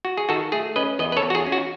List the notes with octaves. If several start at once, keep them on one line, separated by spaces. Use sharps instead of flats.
F#4
G#4
D#3 F#4 A4
A3 G#4
C#4 B4 D#5
E2 B4 D#5
B4
A4 C#5
E2
F#4
G#4
C#4
F#4